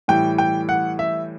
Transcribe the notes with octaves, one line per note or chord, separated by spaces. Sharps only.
A2 E3 G3 G5
G5
F#5
E5